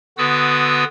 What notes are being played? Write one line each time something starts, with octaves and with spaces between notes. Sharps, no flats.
D3 B3 F#4 B4 D#6 E6